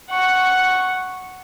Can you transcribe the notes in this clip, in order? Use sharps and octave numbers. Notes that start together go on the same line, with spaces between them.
F#5 C#6